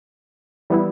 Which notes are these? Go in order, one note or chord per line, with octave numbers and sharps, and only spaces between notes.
E3 G3 B3 E4